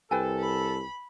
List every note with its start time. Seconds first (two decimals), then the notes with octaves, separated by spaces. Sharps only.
0.11 C2 A4 B4 G5 G#5
0.40 B5